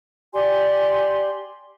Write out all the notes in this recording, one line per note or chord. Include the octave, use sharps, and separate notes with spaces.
G4 D5 G#5 C6